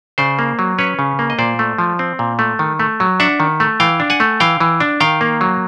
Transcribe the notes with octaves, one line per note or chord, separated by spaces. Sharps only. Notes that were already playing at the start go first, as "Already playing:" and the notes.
C#3 C5 D5
A#3
F#3
C#4 B4 C#5
C#3
A#3
D#5
A#2 C5 D5
A3
F3
C4
A#2
A3
D#3
A3
F#3
D4 E5 F#5
D#3
A3
E3 F5 G5
D4
F#5 G#5
A3
E3 F5 G5
E3
D4
D#3 F5 G5
A#3
F#3